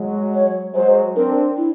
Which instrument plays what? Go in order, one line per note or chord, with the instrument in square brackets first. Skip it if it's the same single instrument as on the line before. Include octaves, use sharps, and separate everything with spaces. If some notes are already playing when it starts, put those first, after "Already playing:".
Already playing: [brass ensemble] F#3 G#3
[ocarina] C#5
[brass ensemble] F#3 G#3 [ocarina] C5
[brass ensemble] C4 D4 [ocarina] A#4
[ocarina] E4